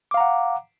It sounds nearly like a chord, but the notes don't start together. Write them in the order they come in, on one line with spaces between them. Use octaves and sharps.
D6 F5 A#5 F#5